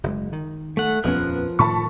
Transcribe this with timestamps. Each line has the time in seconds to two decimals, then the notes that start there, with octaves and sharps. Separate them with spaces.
0.03 F#1 C#3 G#3
0.33 D#3
0.77 A3 F#5
1.04 D#1 F2 F3 B3 C#4 A#4 F#6
1.59 A2 D#3 A5 B5 C#6